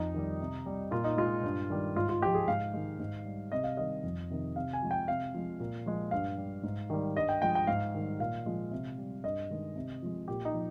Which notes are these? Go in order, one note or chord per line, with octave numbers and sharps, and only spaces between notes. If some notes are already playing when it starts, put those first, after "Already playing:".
Already playing: F2 D#4
D#3 G3
C3
G3
A#2 F4
D#4
G#3 F4
G2
D#3 G3
G#2 F4
F4
F3 G#3 G4
G#4
G#2 F5
D#3 G#3
G#2
G3
C3 D#5
F5
D#3 G3 D#5
F2
C3 D#3
C3 F5
G#5
F3 G#3
G5
C3 F5
F3 G#3
A#2
F3 G#3
G2 F5
G3
G#2
D#3 G3
G2 D#5
G5
F3 G#3 G5
G5
G#2 F5
D#3 G3
A#2 F5
F3 G#3
C3
G3
G2 D#5
D#3 G#3
C3
F3 G#3
A#2 G4
D#4
F3